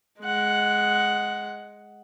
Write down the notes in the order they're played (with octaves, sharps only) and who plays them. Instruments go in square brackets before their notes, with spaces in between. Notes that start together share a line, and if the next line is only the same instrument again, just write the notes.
[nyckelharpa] G#3 F#5